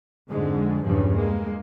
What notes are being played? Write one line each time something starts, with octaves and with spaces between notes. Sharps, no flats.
F2 G#2 D3 G#3
E2 G2 A#2 C#3 F3
G#3 A#3